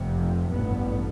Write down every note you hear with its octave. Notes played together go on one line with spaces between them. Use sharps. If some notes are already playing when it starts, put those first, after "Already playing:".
Already playing: F1 F2 C3
A1 G2 B3